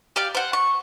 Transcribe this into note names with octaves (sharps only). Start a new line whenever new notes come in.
G4 D5 F5
C5 F#5
C#6